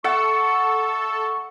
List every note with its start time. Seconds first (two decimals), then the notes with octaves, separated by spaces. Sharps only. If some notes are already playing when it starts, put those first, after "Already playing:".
0.04 A4 E5 F#5 C#6